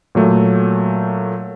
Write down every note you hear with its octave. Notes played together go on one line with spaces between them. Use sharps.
A#2 F#3 A3